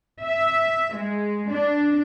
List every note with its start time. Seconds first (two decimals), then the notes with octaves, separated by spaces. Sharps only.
0.23 E5
0.95 G#3
1.52 D4